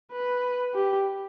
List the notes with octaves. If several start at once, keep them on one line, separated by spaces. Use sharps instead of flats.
B4
G4